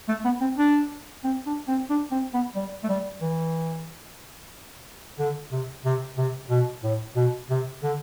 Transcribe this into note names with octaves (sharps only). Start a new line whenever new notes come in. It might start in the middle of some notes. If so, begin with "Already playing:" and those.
A3
B3
C4
D4
C4
D4
C4
D4
C4
B3
G3
A3
G3
E3
D3
C3
C3
C3
B2
A2
B2
C3
D3